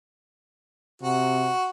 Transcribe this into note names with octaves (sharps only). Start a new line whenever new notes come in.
C3 F#4